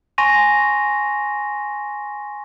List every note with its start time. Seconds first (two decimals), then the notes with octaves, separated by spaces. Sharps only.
0.18 G#5 C6 C#6 A#6 D#7 F7